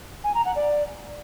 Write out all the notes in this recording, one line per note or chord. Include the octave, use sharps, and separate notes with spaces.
G#5
A#5
F#5
D5